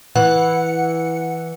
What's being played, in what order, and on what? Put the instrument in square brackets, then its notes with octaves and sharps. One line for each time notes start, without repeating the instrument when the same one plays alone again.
[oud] E3 [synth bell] F#5